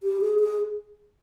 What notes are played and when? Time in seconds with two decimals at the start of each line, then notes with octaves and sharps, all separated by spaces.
0.03 G4
0.21 G#4
0.39 G#4